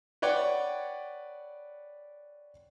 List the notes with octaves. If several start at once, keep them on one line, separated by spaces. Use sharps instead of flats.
B4 C#5 D5 F#5 G5